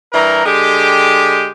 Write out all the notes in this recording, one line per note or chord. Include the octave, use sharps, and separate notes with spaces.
G2 E3 A#4 A#5
D3 G#3 G4